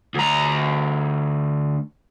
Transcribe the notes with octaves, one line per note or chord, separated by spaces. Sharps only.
D2 A#5